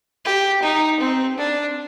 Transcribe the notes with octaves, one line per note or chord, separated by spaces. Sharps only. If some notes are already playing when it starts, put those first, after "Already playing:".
G4
D#4
C4
D4